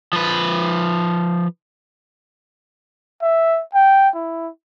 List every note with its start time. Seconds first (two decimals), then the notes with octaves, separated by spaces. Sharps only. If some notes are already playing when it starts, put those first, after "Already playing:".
0.13 F3 B4
3.22 E5
3.75 G5
4.15 E4